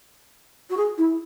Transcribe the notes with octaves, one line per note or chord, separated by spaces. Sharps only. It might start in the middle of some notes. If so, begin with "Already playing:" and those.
F#4
G#4
E4